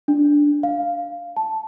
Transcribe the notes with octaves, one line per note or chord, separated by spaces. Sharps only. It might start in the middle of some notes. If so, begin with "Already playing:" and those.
D4
F5
A5